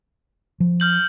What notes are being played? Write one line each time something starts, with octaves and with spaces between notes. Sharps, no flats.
F3
F6 G6 F#7